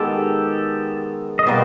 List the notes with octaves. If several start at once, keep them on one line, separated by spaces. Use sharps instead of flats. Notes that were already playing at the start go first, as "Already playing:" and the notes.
Already playing: D#3 G#3 B3 D#4 G4 A4
D#5
B2 G3 A#3 C5 D5